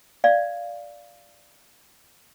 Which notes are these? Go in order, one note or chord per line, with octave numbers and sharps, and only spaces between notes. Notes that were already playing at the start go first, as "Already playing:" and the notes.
D5 F5